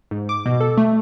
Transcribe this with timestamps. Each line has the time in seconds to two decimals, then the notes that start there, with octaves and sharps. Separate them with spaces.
0.11 G#2
0.29 D6
0.46 B2
0.60 A4
0.77 A3